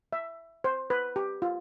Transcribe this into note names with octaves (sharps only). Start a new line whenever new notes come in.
E5
C5
B4
G4
F4